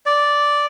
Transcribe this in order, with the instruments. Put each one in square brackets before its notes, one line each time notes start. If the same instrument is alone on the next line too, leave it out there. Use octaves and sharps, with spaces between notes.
[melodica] D5